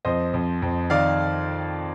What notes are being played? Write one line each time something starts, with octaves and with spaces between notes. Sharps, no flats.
F2 C5 D#5
F2
F2
D#3 D5 F5